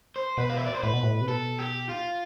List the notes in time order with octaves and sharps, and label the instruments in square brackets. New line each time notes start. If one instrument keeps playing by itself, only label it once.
[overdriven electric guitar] C5
[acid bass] B2 [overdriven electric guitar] B4
[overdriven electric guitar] F5
E5
D5
C5
[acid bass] A2 [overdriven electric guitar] B4
[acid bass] B2
A2
C3
[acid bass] B2 [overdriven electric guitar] A4
[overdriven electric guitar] G4
F4